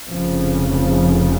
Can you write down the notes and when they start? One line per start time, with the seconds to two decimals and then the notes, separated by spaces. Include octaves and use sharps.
0.10 F1 F2 C#3 F3
0.71 F3